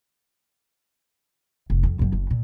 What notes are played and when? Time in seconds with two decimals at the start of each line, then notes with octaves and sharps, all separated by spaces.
1.70 F1
1.83 F2
1.99 A#1 F#2
2.12 F#1
2.30 A#2